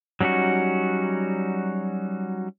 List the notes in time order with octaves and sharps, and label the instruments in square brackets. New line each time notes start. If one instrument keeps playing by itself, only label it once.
[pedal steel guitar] F#3 G3 C#4 D#4 F#4